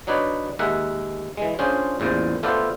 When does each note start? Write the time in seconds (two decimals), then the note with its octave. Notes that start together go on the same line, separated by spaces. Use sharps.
0.07 F#3 D4 D#4 B4 C#5 D5
0.59 D#2 G#3 A#4 E5 F#5
1.37 E3 G#3
1.59 C#4 D4 F4 G#4 C5
2.00 A1 E2 A#2 C5
2.43 A3 B3 F4 A4 C5 D5